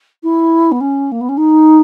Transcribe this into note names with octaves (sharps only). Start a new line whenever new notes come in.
E4
B3
C#4
A#3
B3
C#4
D#4